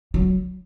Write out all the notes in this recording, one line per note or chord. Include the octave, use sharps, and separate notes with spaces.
F#3